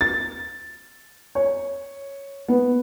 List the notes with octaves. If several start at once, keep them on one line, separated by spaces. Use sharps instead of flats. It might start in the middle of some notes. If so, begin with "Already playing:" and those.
A6
C#5
B3